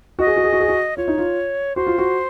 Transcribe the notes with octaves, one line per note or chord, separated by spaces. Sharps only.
F#4 D#5
G#4
F#4
G#4
F#4
G#4
F#4
F4 C#5
D#4
F4
F#4 C5
F4
F#4